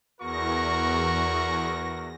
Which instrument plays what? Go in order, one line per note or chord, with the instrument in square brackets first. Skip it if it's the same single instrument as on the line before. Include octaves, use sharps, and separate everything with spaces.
[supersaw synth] E2 A#6 [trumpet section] F#4 A#4 C#6